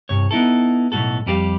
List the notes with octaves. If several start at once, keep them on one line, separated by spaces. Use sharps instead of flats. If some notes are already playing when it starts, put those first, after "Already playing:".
C2 G2 C#5
B3 D#4 E4 A4
B1 E2 A2 F#4 A4
F2 G3 G4 D5 F5